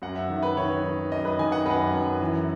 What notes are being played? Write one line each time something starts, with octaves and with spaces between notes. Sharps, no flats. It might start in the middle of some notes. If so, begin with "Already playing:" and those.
F#2 F#5
E5
D#3
B4
D#3 C#5
D#3
F#2 D#5
B4
D#3 G#5
F#5
F#2 B4
F#2
E3